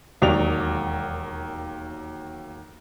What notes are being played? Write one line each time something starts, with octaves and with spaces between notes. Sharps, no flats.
E1 D#2 F#3 D5 F7